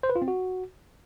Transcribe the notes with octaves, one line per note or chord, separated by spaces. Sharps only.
C5
B4
F4
C4
F#4